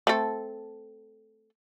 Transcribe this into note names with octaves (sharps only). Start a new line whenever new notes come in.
A3 C4 A4